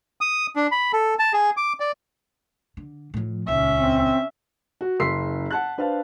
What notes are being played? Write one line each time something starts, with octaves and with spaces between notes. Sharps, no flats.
D#6
D4
B5
A4
A5
G#4
D6
D5
D3
A2 F3
D#1 C#2 C#4 E5
C4
F#4
F#1 C6 E6 B6 C7
F#5 A5 F#6
D4 B4 C5 F5 A5